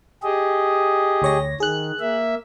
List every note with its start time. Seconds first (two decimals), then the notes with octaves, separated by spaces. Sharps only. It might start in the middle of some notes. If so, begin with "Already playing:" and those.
0.23 G4 G#4 D#5
1.22 D2 C#5 A#6
1.60 D#3 G#4 F#6
2.00 A#3 E5